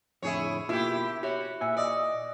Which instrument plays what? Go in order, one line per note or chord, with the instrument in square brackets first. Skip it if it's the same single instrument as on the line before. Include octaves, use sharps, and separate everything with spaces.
[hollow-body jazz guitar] F2 A2 D3 [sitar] E4 G#4 C#5
[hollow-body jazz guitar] B2 A#3 F4 [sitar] E4 G4
[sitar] F#4 [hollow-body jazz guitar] G4 C#5 E5
[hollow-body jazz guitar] A#2 F#5 G#5 [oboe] E5
[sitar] D5 [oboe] D#5